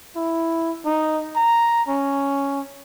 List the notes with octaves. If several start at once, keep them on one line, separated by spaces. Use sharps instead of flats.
E4
D#4
A#5
C#4